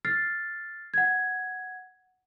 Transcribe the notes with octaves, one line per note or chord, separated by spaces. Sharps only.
F6 A6 C7
F#5 G#6